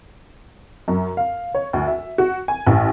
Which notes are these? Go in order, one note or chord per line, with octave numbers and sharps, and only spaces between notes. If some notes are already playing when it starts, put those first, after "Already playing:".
F#2
F5
C#5
D2
E5
F#4
G#5
A1